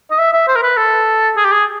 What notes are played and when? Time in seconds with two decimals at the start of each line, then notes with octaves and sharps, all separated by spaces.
0.11 D#5
0.19 E5
0.33 E5
0.48 C5
0.56 A#4
0.63 B4
0.77 A4
1.37 G#4
1.45 G4
1.52 G#4